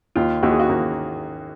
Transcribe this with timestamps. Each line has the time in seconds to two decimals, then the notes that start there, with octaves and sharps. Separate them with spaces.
0.16 D#2 F4
0.43 D#2 F#4
0.51 G#4
0.60 F#4
0.69 D#2 A#3